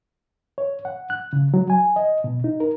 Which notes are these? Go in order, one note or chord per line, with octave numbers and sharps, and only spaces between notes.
C#5
F#5
F#6
C#3
F#3
G#5
D#5
B2
D#4
A#4